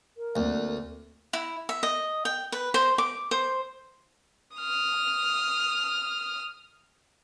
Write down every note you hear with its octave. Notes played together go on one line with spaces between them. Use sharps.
A#4
D2 A#3 C4
E4
E5
D#5
G5
B4
C5
D6
C5
D#6 F6